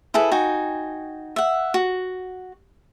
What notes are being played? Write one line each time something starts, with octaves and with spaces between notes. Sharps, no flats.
E4 G#4 A4 B4
D#4 F#4 G5 G#5
E5 F#5
F#4